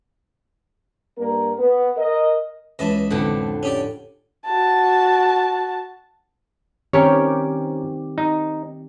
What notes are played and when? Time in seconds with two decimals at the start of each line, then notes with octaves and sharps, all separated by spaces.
1.18 G2 A#3 A#4
1.59 B3
1.98 A#4 D#5
2.79 C#2 E3 D#5 A5
3.10 F2 A2 D3
3.63 C#4 G4 D5
4.46 F#4 A5
6.93 D#3 C4 C#4 G4 A#4 C#5
8.18 D#4